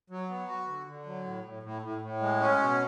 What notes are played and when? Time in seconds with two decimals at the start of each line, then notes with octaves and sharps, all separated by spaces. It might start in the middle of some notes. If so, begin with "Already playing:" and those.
0.10 F#3
0.29 B3
0.48 F#4
0.67 D3
0.87 D3
1.06 F#3
1.25 A2
1.44 A2
1.63 A2
1.82 A2
2.01 A2
2.20 G#3
2.40 C#4
2.59 B2